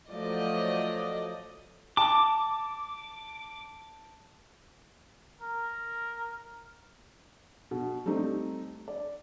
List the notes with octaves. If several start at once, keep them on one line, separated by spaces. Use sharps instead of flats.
F3 F#3 A3 D5 D#5
A5 D6
A#4
B2
G3 A3 C4 D#4 G4
D5